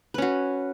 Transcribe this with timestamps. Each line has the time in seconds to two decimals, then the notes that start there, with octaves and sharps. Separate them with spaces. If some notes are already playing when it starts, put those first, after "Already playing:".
0.14 B4
0.18 C#4
0.22 F#4